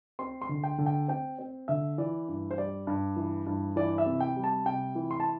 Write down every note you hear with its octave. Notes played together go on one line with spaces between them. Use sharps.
C4 C6
C6
D3
G5
D3
G5
C4 G5
C4
D3 E5
E3 D5
G2
C5
G3 D5
G2
E3
G2
E3 D5
E5
C3
G5
G3
A5
C3 G5
E3
C6
A5